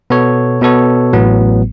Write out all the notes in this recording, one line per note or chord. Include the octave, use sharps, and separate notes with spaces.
B2 B3 A4 C#5
B2 B3 A4 C#5
A1 A2 F#3 B3